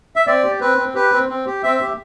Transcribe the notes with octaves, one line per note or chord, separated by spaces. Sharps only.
E5
C4 D5
G4
C4 B4
C4
G4 B4
C4
C4
G4
C4 E5
G4